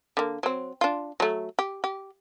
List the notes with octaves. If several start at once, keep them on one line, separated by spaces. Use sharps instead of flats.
D3 A#3
F#3 C4
D4 F4
F#3 A3
G4
G4